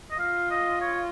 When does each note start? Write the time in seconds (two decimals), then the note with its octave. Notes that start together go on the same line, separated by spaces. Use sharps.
0.11 D#5
0.19 F4 F5
0.51 D#5
0.81 C#5